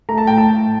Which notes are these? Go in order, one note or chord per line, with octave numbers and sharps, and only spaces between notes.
A3 A#5
A5
A2 G5
A5
A2